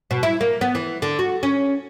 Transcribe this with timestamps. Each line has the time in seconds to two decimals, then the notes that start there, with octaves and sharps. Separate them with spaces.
0.11 B2
0.23 E4
0.41 A#3
0.61 B3
0.75 E3
1.02 D3
1.19 F#4
1.43 C#4